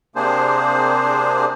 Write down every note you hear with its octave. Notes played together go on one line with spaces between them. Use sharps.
C3 A#3 D4 G#4 C5